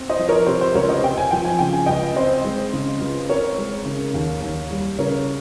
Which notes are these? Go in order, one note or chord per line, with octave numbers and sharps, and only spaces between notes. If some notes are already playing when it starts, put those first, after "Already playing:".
Already playing: C4
C5 D#5
F3
A#4 C#5
C3 C5
C5
C#2 A#4 C#5
C5 D#5
C4 G5
G#5
F3 G5
G#5
C#3 G5
G#5
C#2 D#5 G5
C4 C5 D#5
G#3
C#3
C#2
C4 A#4 C#5
G#3
C#3
D#2
D#2
G3
C#3 A#4 C#5